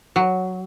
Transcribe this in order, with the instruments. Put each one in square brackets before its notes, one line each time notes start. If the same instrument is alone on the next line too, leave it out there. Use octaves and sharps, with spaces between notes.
[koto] F#3